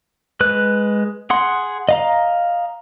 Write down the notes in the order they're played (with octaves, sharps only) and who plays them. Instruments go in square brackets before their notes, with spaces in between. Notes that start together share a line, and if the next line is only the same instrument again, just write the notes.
[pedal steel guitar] G#3 B4 F#6
G#4 F#5 C6
D#5 F5 A#5